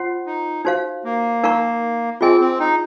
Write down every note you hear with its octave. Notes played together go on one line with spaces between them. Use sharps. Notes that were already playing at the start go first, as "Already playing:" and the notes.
Already playing: F4 C5 F#5 C6
D#4
D#4 F#4 C5 F5
A#3
D#4 A#4 F5 A#5 C#6
C4 F4 G#4 D#5 G#5
C4
D#4